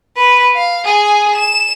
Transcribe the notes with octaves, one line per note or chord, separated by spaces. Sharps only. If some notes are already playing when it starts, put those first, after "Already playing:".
B4
F5
G#4 G#5
E7